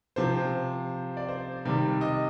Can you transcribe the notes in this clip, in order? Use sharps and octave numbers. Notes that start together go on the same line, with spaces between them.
C3 F3 C5
D5
C5
C3 D#3 G3
D#5